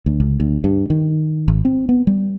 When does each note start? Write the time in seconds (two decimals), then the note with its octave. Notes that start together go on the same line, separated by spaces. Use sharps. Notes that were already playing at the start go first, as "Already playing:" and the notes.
0.06 D2
0.20 C#2
0.40 D2
0.64 G2
0.90 D#3
1.48 G#1
1.65 C4
1.89 B3
2.07 G3